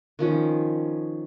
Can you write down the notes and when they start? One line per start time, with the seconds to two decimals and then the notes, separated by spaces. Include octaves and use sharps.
0.19 D#3 F3 C#4